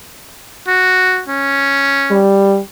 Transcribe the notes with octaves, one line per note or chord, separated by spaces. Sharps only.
F#4
C#4
G3